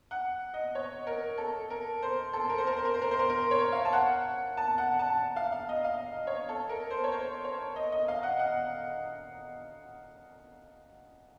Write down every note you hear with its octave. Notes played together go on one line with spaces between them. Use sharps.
F#5
D#5
C#5
A#4
A4
A#4
C5
A4
A#4
C5
A#4
C5
A#4
C5
A#4
C5
A#4
A#4
C#5
F5
A5
F#5
A5
F#5
A5
F5
F5
D#5
F5
C#5
A4
A#4
C5
C#5
C5
C#5
D#5
D#5
F5
F#5
F#5